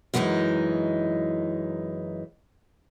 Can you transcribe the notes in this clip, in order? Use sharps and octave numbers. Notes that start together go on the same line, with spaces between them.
F#2 E3 G#3 D4 D#4